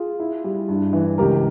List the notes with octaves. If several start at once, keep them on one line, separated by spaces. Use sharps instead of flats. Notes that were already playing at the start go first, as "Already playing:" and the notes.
Already playing: F4 G#4
E4
G3
G2
E3
C#2 G4 A#4